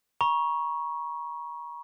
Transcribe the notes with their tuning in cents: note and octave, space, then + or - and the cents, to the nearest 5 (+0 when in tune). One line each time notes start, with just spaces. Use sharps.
A#5 +40 C#6 +0